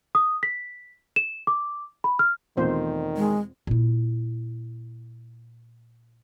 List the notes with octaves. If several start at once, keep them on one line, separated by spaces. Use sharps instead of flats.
D#6
B6
E7
D6
B5
F6
E2 B2 D#3 A3 C4 F4 C5
G#3
A#2 E4